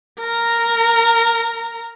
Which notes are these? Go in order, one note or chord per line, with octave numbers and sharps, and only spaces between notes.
A#4 A#5